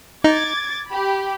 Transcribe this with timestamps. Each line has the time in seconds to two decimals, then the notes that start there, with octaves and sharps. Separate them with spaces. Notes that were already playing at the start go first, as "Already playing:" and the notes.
0.24 D#4 D6 G#6 A6
0.88 G4 B5